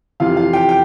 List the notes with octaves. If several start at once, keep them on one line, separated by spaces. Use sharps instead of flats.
F2 C3 E3 F4 F5
F4 F5
G4 G5
G5